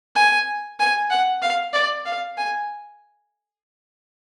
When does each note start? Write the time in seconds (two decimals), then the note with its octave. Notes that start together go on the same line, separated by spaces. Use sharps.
0.16 G#5
0.80 G#5
1.10 F#5
1.42 F5
1.73 D5
2.05 F5
2.37 G#5